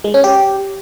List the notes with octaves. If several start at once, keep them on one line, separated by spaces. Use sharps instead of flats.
G#3
C#4
G4